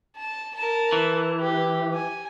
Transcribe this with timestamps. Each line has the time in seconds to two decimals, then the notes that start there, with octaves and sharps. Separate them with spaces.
0.16 A5
0.55 A#4 A5
0.92 E3
1.40 G4
1.94 G#5